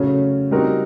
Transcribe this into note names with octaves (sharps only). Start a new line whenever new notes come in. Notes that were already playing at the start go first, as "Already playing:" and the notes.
Already playing: C#3 F#3 A3 C#4
G3 C4 D#4 F#4 A#4